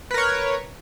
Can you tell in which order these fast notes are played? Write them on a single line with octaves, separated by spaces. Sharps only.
B4 A#4 C#5